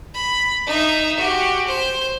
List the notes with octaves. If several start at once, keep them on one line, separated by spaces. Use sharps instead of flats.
B5
D#4 E5
F#4 G4
C5